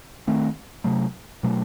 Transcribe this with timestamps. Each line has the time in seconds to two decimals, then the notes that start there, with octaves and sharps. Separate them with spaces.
0.27 D#3 A3 C4
0.84 C3 F#3 A3
1.43 B2 F#3 A3